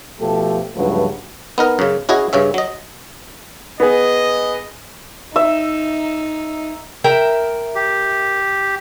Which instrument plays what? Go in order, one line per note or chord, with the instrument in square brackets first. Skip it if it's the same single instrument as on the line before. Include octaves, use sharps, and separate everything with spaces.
[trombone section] B2 F3 A3 G4 A4
C#2 G2 F3 F#3 A3 B4
[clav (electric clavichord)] B3 D#4 A#4
F#2 C#3
C#4 E4 F#4 G#4 D#5
G2 C#3 C#4 E5
F#3 D#5
[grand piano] B3 G#4 [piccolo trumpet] D#5
[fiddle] D#4 [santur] E5
[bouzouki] A#4 E5 G5
[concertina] G4